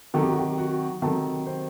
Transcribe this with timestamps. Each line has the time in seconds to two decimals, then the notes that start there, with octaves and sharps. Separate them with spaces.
0.14 C3 D#3 F#3 A4
0.22 G4
0.31 F#4
0.39 G4
0.58 F#4 F#5
1.02 C3 D#3 F#3 A4 A5
1.46 C4 C5